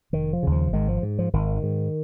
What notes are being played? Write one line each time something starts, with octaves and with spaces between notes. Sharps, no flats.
F1 D#3
F3
D#2 C#3
F3
G#1 D#3 G#3
F3
G#2
F3
G#1 D#3
G#2